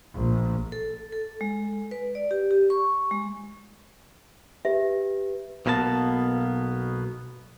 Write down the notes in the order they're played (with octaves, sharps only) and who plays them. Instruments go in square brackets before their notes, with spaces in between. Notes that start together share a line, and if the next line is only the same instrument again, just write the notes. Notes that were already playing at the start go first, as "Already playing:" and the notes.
[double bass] A#1
[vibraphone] A4
A4
G#3
B4
D5
G4
G4
C#6
G#3
[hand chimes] G4 B4 [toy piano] E5
[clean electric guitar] B1 B2 A#3 B3 A5